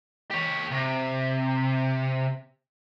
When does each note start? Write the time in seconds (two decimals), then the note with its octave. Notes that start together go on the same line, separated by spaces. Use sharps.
0.31 G4 C#5
0.72 C3